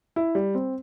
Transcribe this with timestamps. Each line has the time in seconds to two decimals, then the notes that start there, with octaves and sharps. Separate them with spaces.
0.16 E4
0.35 G3
0.55 C4